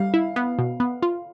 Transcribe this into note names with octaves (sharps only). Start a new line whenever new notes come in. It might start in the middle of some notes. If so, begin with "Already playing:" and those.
Already playing: G3 F5
E4
B3
B2
B3
F4